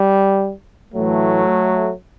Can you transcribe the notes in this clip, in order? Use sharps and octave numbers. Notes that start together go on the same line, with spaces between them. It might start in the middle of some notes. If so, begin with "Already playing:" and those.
Already playing: G3
A2 E3 F#3 A3